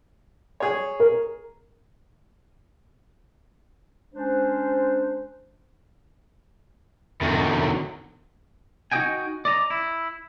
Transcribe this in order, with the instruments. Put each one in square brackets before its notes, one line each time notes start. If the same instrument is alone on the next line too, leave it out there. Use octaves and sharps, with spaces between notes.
[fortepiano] G#4 C#5
[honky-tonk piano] A#4
[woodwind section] G#3 C#4 D4 C5
[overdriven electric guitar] E2 F#3 [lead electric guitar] D3 D#4
[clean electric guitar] D#4 F#4 G4 D#5 G5 G#5
D5 D#5 A#5
E4